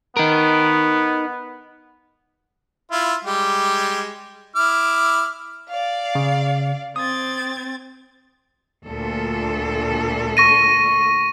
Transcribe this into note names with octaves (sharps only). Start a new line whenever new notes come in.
B3 D#4 A#4
E4 F4
G3 G#3 G4
E4 D6 F6
D5 F5
C#3
C4 D#6 G#6 A6
D2 A#2 A4
C#6 A#6 D#7